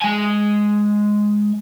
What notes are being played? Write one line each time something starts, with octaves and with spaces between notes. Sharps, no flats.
G#3 G#5